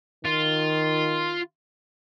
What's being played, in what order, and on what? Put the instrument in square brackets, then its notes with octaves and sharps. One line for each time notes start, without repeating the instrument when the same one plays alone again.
[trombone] D#3 [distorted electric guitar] F4